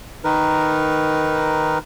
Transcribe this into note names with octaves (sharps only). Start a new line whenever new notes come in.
D#3 D#4 A#4 B4